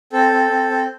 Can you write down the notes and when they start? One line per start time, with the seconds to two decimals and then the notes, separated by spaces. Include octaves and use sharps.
0.12 C4 A4
0.32 C4
0.50 C4
0.70 C4